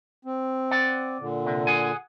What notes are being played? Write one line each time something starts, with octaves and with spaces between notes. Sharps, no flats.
C4
D5 F#5
A#2 D3
C3
G#4 F#5 G#5